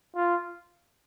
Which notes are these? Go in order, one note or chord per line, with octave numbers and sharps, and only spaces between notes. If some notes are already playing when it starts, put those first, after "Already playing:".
F4